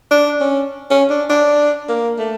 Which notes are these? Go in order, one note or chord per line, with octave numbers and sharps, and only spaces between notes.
D4
C#4
C#4
D4
D4
A#3
A3